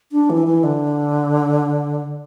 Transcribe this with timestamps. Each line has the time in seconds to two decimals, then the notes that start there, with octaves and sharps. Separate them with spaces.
0.12 D4
0.30 E3
0.46 E3
0.63 D3